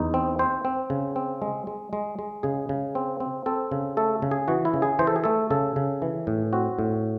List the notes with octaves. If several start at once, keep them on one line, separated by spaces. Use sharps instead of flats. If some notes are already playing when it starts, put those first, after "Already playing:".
Already playing: E2 D#4
C4
C4 C5
C4
C#3
C4
G#3
G#3
G#3
G#3
C#3 G#4
C#3
C4
C4
C4 A4
C#3
A3 A4
C#3
G#4
E3 F#4
E4
C#3
G#4
E3 C5
A4
G#4
A3 A4
C#3 A4
C#3
E3
A2
C4 F#4
A2